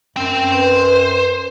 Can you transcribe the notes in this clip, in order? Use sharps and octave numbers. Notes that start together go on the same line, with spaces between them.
F#2 C4 G5
B4 C5